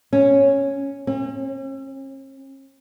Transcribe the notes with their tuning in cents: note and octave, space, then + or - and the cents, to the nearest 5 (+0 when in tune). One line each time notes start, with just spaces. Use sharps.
C#4 -5
C#4 -45